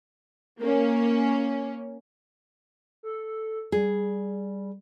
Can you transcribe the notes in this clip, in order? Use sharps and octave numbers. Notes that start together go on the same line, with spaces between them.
A#3 C#4
A4
G3 G#4